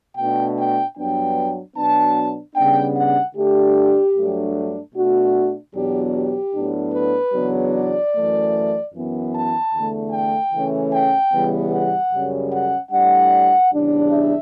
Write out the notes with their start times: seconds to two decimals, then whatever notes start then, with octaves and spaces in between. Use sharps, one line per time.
0.17 B2 A3 D4 G5
0.57 G5
0.97 G2 F#3 B3 D4 G5
1.75 B2 F#3 B3 D4 A5
2.55 C#3 G3 B3 D4 G5
2.96 F#5
3.35 D3 A3 D4 G4
4.15 G2 F#3 A3 D4
4.95 B2 A3 D4 F#4
5.74 E2 B2 F#3 B3 D4 G4
6.14 G4
6.53 A2 F#3 B3 D4
6.93 B4
7.33 E2 C#3 F#3 B3 D4
7.73 D5
8.13 F#2 E3 A3
8.93 F#2 E3 B3
9.32 A5
9.73 E2 D3 A3
10.12 G5
10.52 C#3 E3 A3 C#4
10.91 G5
11.32 E2 C#3 E3 G3 B3
11.72 F#5
12.11 F#2 C#3 G3 C#4
12.51 F#5
12.91 A2 G3 D4 F#5
13.71 E2 C#3 G3 D4
14.10 E5